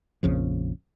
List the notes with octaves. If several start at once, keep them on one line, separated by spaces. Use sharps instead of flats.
A#1 F2 C#3 F3